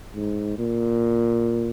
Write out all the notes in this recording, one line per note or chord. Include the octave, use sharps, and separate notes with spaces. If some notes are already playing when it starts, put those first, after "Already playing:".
G#2
A#2